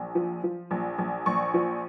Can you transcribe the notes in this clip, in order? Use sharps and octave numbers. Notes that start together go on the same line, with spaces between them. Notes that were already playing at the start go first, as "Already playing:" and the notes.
Already playing: A#1
F3
F3
A#1
A#1
A#1 C#6
F3